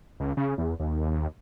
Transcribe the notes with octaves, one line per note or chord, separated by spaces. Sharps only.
C#2
C#3
E2
D#2